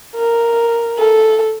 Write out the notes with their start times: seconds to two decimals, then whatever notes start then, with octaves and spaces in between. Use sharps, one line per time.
0.16 A#4
0.98 A4